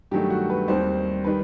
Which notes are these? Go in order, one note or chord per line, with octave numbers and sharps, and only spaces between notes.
G2 D#3 F#3 A3 G4
F#4
B4
D#2 D#3 G3 C4 C5
D#3 G3 B4